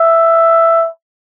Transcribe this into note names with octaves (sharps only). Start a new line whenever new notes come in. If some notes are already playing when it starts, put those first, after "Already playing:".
Already playing: E5